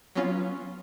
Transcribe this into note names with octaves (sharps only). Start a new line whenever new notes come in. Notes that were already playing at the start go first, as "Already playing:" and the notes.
F#3 B3 C#4 F4